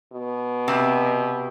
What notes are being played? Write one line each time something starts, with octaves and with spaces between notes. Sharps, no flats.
B2
C3